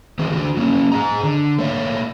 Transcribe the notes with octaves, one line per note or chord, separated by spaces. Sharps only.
E3 C4 F#4 G#4
D3 F#4
F#3 A#3 C#4
G#4 D#5 A#5
D3
A3 A#3 C#5 D5 E5